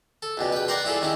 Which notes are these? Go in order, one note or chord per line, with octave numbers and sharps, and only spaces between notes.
A4
C#2 B2 G3
B4 G5
A#4 D5 F#5 G5 A#5 C6
G3 E4 F4 G#4 A4
D#3 C#4 D#4 E4